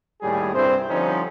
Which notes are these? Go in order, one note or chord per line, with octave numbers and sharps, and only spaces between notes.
D#2 A2 G3 G#4
C2 G2 C4 E4 C5
D3 F3 G3 C4 C#4 D#4